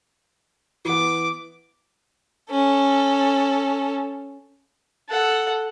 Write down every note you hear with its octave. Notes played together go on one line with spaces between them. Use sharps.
E3 B3 D6
C#4 A4
A4 F#5